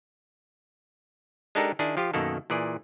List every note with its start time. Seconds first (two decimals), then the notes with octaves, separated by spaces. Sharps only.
1.55 G#3 D4 D#4 G4 A4 A#4
1.79 D#3 D4 E4 G#4
1.97 F3 F4 G4
2.14 F#2 B2 D#3 A#3 A4
2.50 A#2 E3 G#4 D5